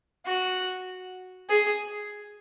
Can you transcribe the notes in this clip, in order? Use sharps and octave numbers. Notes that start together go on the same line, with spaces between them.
F#4
G#4